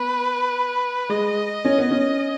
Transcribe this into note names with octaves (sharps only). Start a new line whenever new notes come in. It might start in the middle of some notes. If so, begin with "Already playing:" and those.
Already playing: B3 B4
G#3 D#5
C#4
B3
C#4